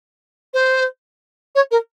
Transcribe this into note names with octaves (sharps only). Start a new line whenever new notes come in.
C5
C#5
A#4